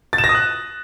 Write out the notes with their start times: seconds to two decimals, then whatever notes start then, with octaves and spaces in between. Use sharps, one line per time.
0.13 A6
0.18 E7
0.24 A#6
0.29 D#6
0.35 F#6